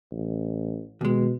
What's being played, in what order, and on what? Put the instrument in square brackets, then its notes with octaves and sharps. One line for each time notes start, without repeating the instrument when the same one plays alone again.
[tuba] A1
[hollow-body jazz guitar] D#2 G#3 [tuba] B2